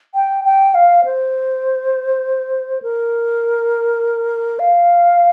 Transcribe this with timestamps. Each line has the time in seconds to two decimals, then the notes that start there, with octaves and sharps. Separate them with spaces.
0.15 G5
0.45 G5
0.75 F5
1.05 C5
2.82 A#4
4.59 F5